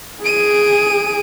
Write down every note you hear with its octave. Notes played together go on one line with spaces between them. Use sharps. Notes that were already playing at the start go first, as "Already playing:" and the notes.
G#4 D7 D#7